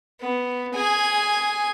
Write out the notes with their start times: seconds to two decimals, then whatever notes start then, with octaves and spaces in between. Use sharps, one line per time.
0.21 B3
0.75 G#4 G#5